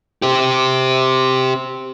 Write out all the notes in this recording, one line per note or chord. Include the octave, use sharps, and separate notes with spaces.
G4 C5